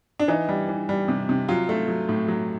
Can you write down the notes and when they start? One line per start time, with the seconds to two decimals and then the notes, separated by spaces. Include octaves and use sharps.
0.19 D4
0.28 E3 D#4
0.49 G3
0.68 E3
0.89 G3
1.08 C3
1.29 C3
1.48 F#3 F4
1.69 A3
1.88 F#3
2.09 A2
2.28 F#3